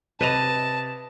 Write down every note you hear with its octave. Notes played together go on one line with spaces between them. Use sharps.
C3 B4 D#5 A5 E7 F7